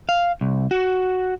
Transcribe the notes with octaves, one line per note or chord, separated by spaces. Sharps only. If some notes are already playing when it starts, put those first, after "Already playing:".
F5
C2
F#4